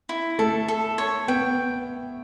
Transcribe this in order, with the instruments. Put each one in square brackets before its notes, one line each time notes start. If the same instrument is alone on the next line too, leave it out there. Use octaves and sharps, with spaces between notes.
[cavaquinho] E4
[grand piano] A3 [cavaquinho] A4
[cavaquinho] A4
C#5
[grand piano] B3 [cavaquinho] G5